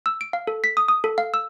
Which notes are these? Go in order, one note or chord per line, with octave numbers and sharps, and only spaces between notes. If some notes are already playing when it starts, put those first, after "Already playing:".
E6
D7
F5
A4
B6
D#6
D#6
A4
F5
E6